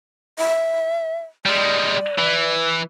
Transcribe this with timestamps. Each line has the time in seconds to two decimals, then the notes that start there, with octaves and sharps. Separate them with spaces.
0.39 E5
1.46 G3 G#3 D5
2.18 E3